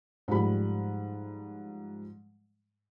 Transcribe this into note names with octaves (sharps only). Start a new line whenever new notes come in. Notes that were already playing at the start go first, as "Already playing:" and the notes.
G#2 F3 G3 A3 B5